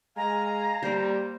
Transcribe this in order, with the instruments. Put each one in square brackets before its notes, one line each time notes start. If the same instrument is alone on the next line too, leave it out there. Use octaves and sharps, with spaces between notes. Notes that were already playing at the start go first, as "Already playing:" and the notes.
[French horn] G#3 [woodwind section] F5 G#5 [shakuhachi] A#5
[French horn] G3 [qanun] A#3 C5